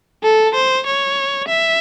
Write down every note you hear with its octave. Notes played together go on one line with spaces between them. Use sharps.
A4
C5
C#5
E5